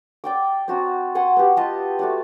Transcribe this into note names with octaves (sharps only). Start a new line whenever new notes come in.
D5 G5 D6
C4 F#4 A5 A#5
F#5 G#5 C6 C#6
B3 G4
F4 D#5 A5
A3 F#4 D5